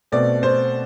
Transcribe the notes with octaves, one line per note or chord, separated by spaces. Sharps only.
B2 A3 C4 D5
C5